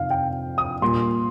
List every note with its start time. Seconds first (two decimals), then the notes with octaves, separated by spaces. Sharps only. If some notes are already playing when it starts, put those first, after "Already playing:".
Already playing: F2 C3 D#3 F5
0.10 G5
0.58 D#6
0.82 A#2 G3 A#3 C6